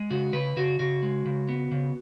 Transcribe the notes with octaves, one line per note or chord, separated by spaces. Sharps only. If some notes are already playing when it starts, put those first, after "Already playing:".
Already playing: G#3
C#3 F#4
C#3 B4
C#3 F#4
C#3 F#4
G#3
C#3
B3
C#3